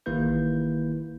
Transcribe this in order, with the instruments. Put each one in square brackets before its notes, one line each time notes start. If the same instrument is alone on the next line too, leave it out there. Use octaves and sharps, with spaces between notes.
[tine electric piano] A1 D#3 A#3 E4 B4 G6